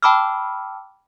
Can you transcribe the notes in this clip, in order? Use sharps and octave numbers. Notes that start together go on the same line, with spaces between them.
G5 A5 B5 D6 E6 F6